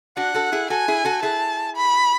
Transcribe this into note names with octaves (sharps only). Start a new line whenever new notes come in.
D4 F#4 F#5
F#4 A4
E4 G#4
F#4 A4 G#5
E4 G#4
F#4 A4
E4 G#4 A5
B5